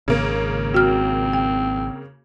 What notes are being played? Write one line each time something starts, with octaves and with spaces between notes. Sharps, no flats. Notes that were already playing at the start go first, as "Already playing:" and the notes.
G#1 C#3 A#3
C4 F#4 F6
G5